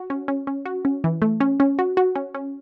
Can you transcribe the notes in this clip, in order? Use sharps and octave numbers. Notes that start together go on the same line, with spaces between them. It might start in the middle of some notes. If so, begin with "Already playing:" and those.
Already playing: F#4
C#4
C#4
C#4
F#4
C#4
E3
A3
C#4
C#4
F#4
F#4
C#4
C#4